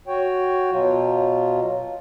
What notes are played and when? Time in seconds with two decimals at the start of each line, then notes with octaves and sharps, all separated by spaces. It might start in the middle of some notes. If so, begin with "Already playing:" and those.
0.07 F#4 C#5 G5
0.72 B2 F#3 F4